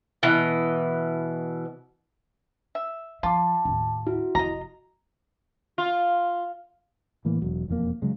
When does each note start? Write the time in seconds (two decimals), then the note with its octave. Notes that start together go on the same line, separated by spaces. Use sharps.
0.23 B2 E3
2.75 E5
3.23 F3 F4 A5 D6
3.65 D#2 A2
4.07 E4 F#4
4.35 F1 F4 D#5 A#5
5.78 F4
7.25 A2 E3 A#3
7.42 E1 F#3
7.68 E1 F2 E3 A#3
8.02 C#3 F#3 G#3